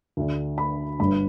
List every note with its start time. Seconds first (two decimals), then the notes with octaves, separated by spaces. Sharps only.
0.17 D2 D3
0.58 B5
0.99 G1 G2 D3 B5